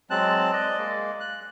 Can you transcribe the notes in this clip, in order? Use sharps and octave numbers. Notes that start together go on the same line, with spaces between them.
F#3 G#3 C4 A5 F#6
D5 D#5
G#3 A#3
F#6